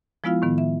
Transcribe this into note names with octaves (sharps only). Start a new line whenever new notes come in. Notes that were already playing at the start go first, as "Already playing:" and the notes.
F3 G#3 B3 E4 F4 F5
A2 D#3 B3
E5